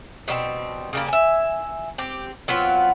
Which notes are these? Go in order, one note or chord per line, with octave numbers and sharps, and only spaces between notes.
B2 G3 A#3 C4
C#3 G3 A#3
E5 G#5
C4 G4
F#3 B3 C4 F4